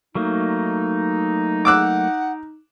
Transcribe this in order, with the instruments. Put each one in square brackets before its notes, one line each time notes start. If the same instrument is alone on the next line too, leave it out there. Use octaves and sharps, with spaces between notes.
[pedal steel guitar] F#3 A3 A#3 [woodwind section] D#4
[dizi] F#5 [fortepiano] D6 E6 F#6